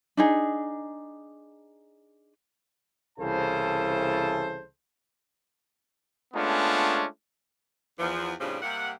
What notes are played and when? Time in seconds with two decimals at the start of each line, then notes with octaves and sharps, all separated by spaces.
0.17 D4 D#4 G#4
3.19 C2 C#3 E3 A4 C5 A5
6.34 G#3 A3 B3 C#4 D4 F4
7.99 E2 F3
8.41 F2 A2 C#3 F3 G3 D4
8.62 C3 G3 A#3 F#5